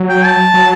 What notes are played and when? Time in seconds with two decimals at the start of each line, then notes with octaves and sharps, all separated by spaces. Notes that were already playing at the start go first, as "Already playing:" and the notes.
Already playing: F#3
0.09 G5
0.25 A5
0.54 F#3